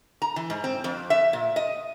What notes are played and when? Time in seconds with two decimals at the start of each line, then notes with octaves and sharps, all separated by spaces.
0.22 A#5
0.36 E3
0.50 G#2
0.64 C4
0.84 F2
1.10 E5
1.33 A#2
1.56 D#5